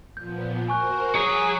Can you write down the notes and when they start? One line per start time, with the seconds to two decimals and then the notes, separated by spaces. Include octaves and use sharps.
0.17 A#2 F3 B3 G6
0.68 F#4 A#4 C5 G#5 C#6 F#6
1.15 G#4 C#5 A#5 B6